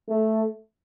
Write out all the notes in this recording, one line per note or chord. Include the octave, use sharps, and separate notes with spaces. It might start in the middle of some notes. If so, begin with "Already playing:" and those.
A3